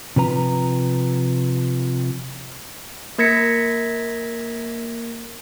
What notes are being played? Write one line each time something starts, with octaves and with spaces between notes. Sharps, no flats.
C3 F3 B4 A#5
A#3 A#4 G#6 A#6 B6 C#7